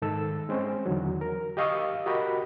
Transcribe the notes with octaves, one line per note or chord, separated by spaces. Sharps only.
G#2 D#3 A4 E6
G#3 C4 C#4 C5
E2 D3 D#3 F#3
A#4
G4 D#5 F5 C#6 D#6 E6
F#4 G4 A#4 D#5 B5